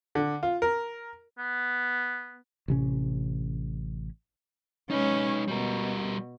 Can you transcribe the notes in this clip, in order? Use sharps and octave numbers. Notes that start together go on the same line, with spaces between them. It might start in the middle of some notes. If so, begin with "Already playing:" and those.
D3
F4
A#4
B3
A1 C3 C#4
G#3 C#4 D#4 B4
B2 G3 A#4